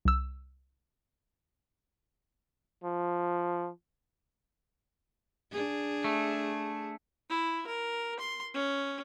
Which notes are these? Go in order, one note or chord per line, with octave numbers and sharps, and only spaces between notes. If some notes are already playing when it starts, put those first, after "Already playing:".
C2 E6
F3
D4 G#4
A3
E4
A#4
C6
C#4